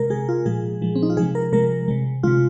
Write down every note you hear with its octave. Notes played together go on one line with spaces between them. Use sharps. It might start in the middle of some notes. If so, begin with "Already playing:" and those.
Already playing: C3 G#3 A#4
C3 G#3 G#4
F4
A#2 F3 G#3 G#4
A#2 F3 G#3
C4
D#4
F4
C3 F3 G#3 G#4
A#4
C3 F3 G#3 A#4
C3 G#3
C3 G#3 F4